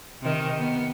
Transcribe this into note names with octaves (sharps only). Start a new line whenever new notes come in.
C3 D#3
B3